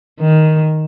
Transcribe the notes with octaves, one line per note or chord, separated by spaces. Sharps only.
D#3